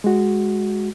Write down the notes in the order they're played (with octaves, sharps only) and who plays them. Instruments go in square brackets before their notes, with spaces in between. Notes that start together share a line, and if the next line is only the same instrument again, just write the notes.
[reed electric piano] G#3 F#4